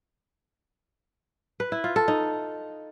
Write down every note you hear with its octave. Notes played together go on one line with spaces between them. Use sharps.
B4
E4
F4
A4
D#4